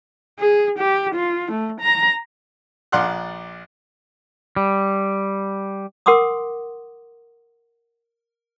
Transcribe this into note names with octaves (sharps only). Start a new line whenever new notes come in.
G#4
G4
F4
A3
A#5
A#1 D5 F#5 C6 F6 F#6
G3
A#4 F#5 C6 D6 D#6